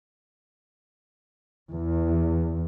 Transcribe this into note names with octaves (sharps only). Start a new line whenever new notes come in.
E2